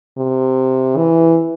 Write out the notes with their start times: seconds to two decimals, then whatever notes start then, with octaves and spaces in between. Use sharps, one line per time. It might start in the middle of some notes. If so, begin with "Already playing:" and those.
0.18 C3
0.97 E3